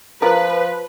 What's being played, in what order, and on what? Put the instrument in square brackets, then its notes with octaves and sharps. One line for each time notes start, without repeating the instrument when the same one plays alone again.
[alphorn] F3 [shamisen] F4 A#4 [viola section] B4